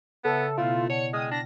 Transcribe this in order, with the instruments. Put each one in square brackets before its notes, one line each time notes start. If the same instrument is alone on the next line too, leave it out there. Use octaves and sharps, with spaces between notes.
[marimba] C#3 E5 [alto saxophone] B3 [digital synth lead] A4
[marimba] B2 B3 E4 [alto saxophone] A3 [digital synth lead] F4
[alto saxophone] C#5 [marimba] D5 F#5 A5 [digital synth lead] C#7
[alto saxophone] G#3 [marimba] G5 F6 [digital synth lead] D#6
[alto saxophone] D4 [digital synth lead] A#6